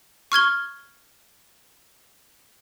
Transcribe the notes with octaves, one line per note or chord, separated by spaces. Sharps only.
C#6 F6 G#6 G7